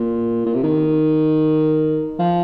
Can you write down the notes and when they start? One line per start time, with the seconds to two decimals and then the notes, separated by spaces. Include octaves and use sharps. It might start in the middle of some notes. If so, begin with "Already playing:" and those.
Already playing: A#2
0.46 A#2
0.54 C3
0.63 D#3
2.19 F3